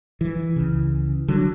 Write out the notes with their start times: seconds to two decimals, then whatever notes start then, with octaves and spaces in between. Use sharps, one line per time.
0.21 E3
0.56 C#2 C#3
1.28 D3 F#3